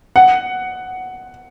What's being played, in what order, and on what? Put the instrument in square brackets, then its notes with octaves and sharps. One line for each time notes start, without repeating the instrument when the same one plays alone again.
[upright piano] F#5